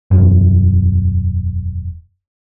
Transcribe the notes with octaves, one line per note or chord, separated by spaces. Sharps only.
E1 F#2